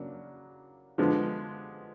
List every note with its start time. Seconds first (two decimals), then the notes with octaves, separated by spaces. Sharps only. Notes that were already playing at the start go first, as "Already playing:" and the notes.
Already playing: C#3 F#3 A#3 D4
0.98 D3 F3 G#3 B3